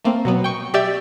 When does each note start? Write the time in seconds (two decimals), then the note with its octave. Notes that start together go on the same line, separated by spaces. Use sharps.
0.04 A3 A#3 C4
0.25 B2 F#3 B3
0.44 G5 C#6
0.74 G4 D5 E5 G5 E6